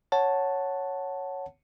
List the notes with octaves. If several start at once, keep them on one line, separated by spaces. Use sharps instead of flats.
C#5 F#5 A5